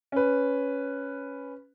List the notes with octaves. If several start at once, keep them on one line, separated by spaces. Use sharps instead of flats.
C#4 B4